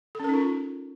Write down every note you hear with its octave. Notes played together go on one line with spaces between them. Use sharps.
C#4 D#4 F4 A4 A#4